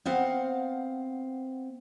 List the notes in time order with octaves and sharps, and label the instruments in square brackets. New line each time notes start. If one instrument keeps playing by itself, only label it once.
[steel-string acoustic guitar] B3 C4 F5 F#5